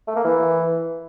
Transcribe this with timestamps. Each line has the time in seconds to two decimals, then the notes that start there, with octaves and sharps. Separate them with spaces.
0.08 A3
0.16 A#3
0.24 E3